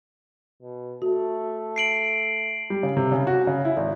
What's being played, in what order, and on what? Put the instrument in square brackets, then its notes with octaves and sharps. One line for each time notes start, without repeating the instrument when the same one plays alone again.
[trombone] B2
[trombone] A3 [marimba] F#4
[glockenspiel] C7 D7 F#7
[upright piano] G3
C#3
C3
C#3
F#4
C#3
E4
G#1